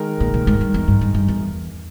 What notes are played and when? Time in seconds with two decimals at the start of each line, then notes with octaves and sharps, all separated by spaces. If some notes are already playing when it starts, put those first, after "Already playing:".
Already playing: D#3 G#3 D#4 A#4
0.20 A#2
0.34 A#2
0.47 G#2
0.61 G2
0.74 E2
0.88 G2
1.01 G2
1.14 G2
1.28 E2